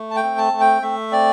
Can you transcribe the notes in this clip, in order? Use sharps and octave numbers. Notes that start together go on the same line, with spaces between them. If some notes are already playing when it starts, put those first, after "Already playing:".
Already playing: A3
A5
G5
C4
A5
A3
G5
A3 E5
C4 D5